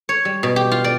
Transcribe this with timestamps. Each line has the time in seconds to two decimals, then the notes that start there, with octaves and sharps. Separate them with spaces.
0.09 C#5
0.25 G3
0.43 B2
0.56 G4
0.72 F4
0.84 D5